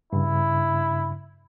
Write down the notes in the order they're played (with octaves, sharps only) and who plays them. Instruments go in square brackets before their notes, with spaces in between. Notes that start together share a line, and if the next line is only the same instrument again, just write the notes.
[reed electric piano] G2 C#3 [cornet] E4